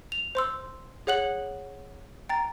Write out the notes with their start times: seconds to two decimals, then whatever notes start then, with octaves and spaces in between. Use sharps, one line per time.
0.12 F7
0.35 C5 C6 E6
1.07 G#4 C#5 F#5 F#6 F#7
2.29 G5 A#5 A6